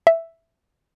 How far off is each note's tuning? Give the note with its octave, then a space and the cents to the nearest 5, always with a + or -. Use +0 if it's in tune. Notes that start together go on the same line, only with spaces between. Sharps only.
E5 +5